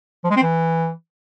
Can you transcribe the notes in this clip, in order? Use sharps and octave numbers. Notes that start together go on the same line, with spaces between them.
F3
G#3
C4
E3